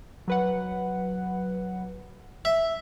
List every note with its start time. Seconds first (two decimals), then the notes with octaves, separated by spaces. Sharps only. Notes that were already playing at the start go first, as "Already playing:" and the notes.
0.28 F#3 B4 F#5
2.45 E5